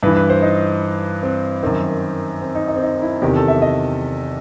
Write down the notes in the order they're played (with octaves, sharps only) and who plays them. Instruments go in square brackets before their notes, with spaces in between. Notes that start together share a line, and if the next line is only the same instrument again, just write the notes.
[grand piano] G2 E3 B4
B4
C5
D#4
C4
F#2 D#3 C4
C4
D#4
D#4
C4
D#4
E4
E2 C3 D#3 G4
A4
E5
D#5